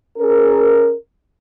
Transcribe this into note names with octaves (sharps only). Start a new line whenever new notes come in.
C#4 G#4 A#4